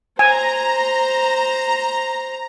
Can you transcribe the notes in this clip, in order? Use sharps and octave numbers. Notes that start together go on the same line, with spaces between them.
C5 G#5 A#5